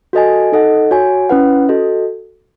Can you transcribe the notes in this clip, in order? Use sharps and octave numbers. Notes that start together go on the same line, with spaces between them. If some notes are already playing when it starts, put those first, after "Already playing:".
F#4 A4 D#5 G#5
D#4 A4 D#5 F#5
F#4 C#5 G#5
C#4 E4 B4 F#5
F#4 A4 D#5